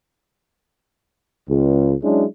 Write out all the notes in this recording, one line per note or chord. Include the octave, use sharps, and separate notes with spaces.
C#2
F#3 G#3 C#4 D4 E4